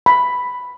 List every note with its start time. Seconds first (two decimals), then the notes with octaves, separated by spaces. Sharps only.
0.06 B5